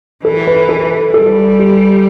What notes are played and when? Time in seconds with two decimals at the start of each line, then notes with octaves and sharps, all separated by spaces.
0.24 E3 A4
0.47 B4
0.69 A4
1.14 G3 A4
1.59 G4